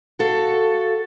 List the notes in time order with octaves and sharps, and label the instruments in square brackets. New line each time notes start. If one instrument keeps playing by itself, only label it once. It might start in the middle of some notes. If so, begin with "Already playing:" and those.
[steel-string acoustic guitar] F#4 A4 F5